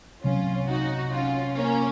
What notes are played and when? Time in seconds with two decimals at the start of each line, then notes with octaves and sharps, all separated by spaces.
0.24 C2 C3 F#3 C#4 F4
0.68 D#4 F#4
1.12 C#4 F4
1.56 A#3 C#4